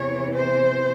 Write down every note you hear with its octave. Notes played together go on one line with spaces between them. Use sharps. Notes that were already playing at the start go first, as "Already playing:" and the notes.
Already playing: E2 C3 E3 C#5
C5